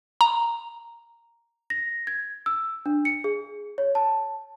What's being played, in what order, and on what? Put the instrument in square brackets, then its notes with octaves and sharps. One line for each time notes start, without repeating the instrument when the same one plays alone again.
[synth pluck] A#5
[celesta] A#6
G#6
E6
D4
C#7
G#4
C#5
A5